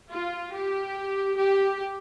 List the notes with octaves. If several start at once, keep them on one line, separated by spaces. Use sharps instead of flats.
F4
G4
G4